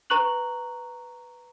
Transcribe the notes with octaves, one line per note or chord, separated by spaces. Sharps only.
B4 A#5 C#6 F#6 F#7